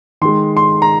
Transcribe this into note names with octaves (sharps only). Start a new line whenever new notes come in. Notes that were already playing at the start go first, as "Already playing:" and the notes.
D#3 G#3 C6
C6
A#5